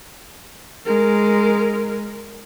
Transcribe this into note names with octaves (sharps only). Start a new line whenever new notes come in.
G#3 A#4